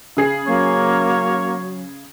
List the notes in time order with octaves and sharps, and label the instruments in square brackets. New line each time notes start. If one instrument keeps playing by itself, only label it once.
[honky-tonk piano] C#3 G#4 C7
[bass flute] F#3 [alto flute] A#3 [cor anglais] C#5